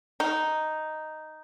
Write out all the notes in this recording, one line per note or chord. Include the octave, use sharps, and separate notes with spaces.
D#4